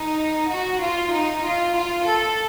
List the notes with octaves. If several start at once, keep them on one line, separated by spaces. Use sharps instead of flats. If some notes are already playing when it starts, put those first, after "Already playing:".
Already playing: D#4
F#4
F4
D#4
F4
F4
A4